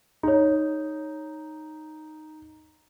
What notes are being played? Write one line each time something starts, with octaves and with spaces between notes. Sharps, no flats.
D#4 G#4 C#5